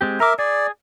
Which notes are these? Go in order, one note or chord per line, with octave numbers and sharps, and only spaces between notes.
G#3 C4 G4
A#4 E5 A#5 D6
G#4 D5